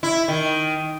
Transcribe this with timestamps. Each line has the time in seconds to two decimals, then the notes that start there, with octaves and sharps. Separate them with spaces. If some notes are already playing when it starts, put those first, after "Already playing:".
0.03 E4
0.28 D#3